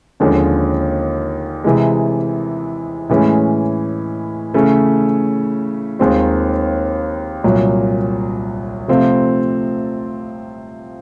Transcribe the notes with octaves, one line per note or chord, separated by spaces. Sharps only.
D#2 D3 F3 G#3 C#4
C3 E3 G#3
A2 E3 G#3 C#4
C#3 E3 A3 C#4
D#2 D#3 G#3 C4 F4
C2 A#2 F#3
C3 F3 A3 C4 F4